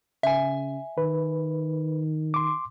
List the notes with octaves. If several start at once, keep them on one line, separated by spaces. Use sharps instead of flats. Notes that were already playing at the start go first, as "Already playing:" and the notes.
C#3 E5 G#5
D#3 B4
C6 D6